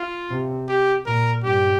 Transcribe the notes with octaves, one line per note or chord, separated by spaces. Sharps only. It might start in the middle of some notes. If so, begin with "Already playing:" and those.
Already playing: F4
C3
G4
A#2 A#4
G2 G4